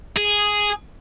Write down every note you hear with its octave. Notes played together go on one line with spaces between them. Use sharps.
G#4